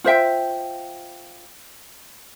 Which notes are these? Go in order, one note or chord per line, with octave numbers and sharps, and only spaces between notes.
F4 C5 E5 G5